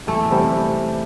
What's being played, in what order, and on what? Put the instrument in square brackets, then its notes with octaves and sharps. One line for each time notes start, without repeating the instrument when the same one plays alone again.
[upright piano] E2 [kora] A3
[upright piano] C3 G3 C4 G4